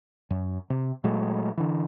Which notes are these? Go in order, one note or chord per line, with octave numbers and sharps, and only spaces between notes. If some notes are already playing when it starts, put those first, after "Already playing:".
F#2
C3
A#2 F#3 G#3 A3
D3 E3